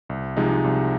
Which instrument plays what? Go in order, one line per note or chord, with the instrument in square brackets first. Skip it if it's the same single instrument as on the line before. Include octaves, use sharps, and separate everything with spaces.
[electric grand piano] C2
C3 F3 G#3 D#4
C2